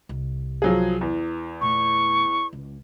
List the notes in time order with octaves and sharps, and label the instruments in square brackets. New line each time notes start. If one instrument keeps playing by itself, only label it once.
[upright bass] C2
[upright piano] F3 F#3 G#4
E2
[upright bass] A#2 A3 [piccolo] C#6
[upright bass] C#2